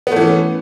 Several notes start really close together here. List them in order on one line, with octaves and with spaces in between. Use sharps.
B3 A3 E3 C#4